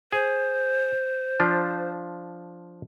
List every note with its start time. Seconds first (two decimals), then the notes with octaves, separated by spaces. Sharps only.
0.12 G#4 C5
1.40 F3 D4 F4